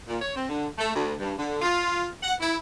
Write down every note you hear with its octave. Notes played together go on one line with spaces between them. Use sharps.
A#2
C#5
C4
D3
A3
D2
G2
D3
F4
F#5
E4